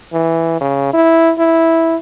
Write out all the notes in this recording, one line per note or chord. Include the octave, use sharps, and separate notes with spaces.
E3
C#3
E4
E4